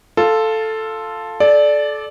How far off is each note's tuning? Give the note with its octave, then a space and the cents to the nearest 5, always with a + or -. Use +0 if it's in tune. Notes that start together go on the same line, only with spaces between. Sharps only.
F4 +0 A4 +0
A4 -30 D5 +0